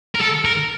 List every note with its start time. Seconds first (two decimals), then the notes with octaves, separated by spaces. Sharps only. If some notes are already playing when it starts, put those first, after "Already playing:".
0.15 A#4
0.21 A4
0.45 A#4